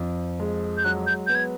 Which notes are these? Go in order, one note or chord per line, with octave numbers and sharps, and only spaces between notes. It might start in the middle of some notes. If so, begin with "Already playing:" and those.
Already playing: F2 F3
G#3
G6
F#3 F#6
G6
B3 G6
G#6